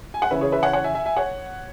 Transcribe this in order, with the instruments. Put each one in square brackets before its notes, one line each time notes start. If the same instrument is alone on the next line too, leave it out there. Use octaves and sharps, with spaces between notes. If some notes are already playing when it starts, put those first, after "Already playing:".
[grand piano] G#5
F#5
C#3 E3 C#4 B4 E5
G#4 C#5
B4 E5
C#5 F#5
C#5 F#5
E5 G#5
E5 G#5
E5 G#5
C#5 F#5